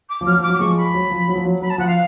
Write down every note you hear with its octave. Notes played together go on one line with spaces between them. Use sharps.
D6
F3
F#3 F6
F3
D6
F#3
D6
F3 G#3 C#6
B5
F#3
F3
F#3
F3
F#3
F#3 B5
A5
F3 F#5
F5